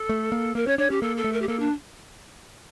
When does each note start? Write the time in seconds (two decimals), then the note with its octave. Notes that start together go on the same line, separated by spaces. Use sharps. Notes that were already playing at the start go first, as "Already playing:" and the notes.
Already playing: A4
0.09 A3
0.32 A#3
0.55 A#3 A#4
0.67 C#4 C#5
0.78 D4 C#5
0.90 C#4 G4
1.02 A#3 A4
1.17 A4
1.24 A3
1.33 A#4
1.42 G4
1.48 A#3 A4
1.60 D4